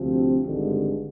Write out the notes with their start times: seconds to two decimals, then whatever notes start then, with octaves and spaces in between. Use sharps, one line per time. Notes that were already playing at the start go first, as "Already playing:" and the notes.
Already playing: D2 C3 F3 C4
0.45 G#1 G2 D3 G#3